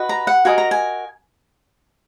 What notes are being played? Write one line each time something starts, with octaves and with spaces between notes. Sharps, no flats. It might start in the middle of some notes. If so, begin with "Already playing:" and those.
Already playing: F#4 B4 D#5
A#5
F#5
F#4 A#4 D#5 G#5
A#5
G#5